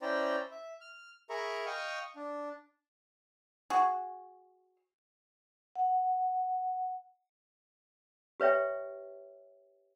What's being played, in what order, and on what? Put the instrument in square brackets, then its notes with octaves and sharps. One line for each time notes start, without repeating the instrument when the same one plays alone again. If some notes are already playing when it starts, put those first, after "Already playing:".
[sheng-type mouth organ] C#4 E4 C5 D5 G5 A#5
E5
F6
G#4 A#4 E5 A#5 B5 C#6
D#5 F5 G5 C#6 D#6 F6
D4
[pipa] F#4 G#4
[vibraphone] F#5
[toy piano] G4 B4 C#5 E5 G5